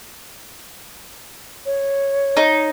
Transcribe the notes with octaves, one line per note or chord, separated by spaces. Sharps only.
C#5
D#4